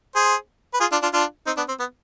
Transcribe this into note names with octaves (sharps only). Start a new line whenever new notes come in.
G#4 C5
B4
F4 G#4
D4 F4
D4 F4
D4 F4
C4 D#4
B3 D4
C4
B3